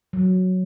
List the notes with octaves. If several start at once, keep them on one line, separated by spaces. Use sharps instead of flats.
F#3